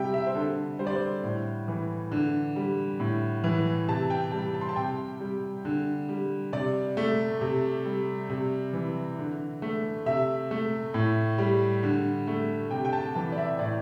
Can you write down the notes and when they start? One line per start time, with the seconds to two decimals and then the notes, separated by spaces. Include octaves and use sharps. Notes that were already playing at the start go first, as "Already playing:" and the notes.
Already playing: C3 G3 E5 G5
0.14 E5
0.27 C5
0.35 D3 A4
0.79 G3 C5
0.87 D5
0.95 C5
1.23 A2
1.68 E3
2.12 D3
2.56 G3
3.00 A2
3.44 E3
3.88 C3 A5
4.10 G5
4.32 G3 A5
4.54 A5
4.61 C6
4.69 A5
4.76 C3 G5
5.20 G3
5.65 D3
6.09 G3
6.53 C3 D5
6.97 A3
7.41 C3
7.85 G3
8.30 C3
8.73 E3
9.19 D3
9.62 A3
10.06 C3 E5
10.51 A3
10.94 A2
11.38 G3
11.83 D3
12.27 A3
12.71 C3 G5
12.85 G5
12.93 A5
13.15 E3 A5
13.32 D5
13.38 E5
13.59 A2 D5